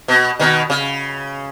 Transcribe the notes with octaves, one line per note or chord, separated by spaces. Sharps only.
B2
B2 D#3
C#3